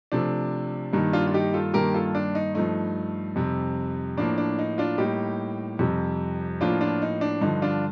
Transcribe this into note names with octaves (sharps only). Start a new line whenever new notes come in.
C3 F3 A3 D4
G2 D#3 G3 A#3 D#4
D4 F4
F4
D#4 G4
F4 A4
G2 D#3 A#3 G4 A#4
F4 A4
D4
D#4
G2 F3 A3 D#4
F2 C3 G3
A2 F3 A#3 D4
D4
D#4
D4 F4
A2 G3 A#3 D#4 G4
F2 C3 G3
A2 F3 A#3 D4 F4
D4 F4
D#4
D4
G2 D3 F3 D#4
D4 F4